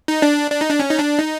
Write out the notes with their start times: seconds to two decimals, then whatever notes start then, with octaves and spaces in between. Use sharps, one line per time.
0.08 D#4
0.22 D4
0.51 D4
0.61 D#4
0.70 D4
0.80 C#4
0.90 D#4
0.99 D4
1.19 D#4